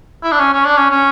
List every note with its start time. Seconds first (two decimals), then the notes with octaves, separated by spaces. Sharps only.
0.24 E4
0.32 D4
0.40 C#4
0.53 C#4
0.65 D4
0.78 C#4
0.91 C#4